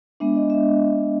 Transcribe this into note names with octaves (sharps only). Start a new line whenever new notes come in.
G#3 B3 D4 E5
D#5
E5